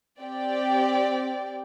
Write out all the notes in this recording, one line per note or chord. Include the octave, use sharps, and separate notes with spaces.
C4 G4 D5 G5